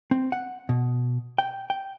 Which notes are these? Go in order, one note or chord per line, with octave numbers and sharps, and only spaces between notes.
C4
F#5
B2
G5
G5